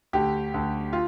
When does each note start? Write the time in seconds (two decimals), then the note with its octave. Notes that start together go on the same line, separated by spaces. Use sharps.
0.13 D2 D3 G4
0.54 D2 D3
0.93 F4